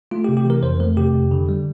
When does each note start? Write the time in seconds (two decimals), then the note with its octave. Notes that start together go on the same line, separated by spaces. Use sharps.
0.11 A3 F4
0.24 G4
0.29 C3
0.37 G4
0.45 E3 A#4
0.63 F2 C5
0.80 A3 A#4
0.97 C3 G4
1.14 F2
1.31 D3
1.49 G3